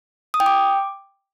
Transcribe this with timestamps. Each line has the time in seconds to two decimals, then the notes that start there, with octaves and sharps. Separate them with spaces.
0.34 D#6
0.40 G5
0.46 D6